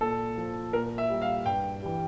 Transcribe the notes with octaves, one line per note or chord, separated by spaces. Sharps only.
A#2 A4
F3
A#2 A#4
E5
G3
F5
G2 G5
E3 G3